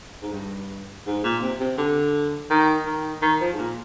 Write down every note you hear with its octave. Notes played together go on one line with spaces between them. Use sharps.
G#2
G2
G#2
A#2
C3
C3
D3
D#3
D#3
D#3
F3
G#2
A#2